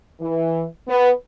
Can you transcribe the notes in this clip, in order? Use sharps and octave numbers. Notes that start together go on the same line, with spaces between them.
E3
B3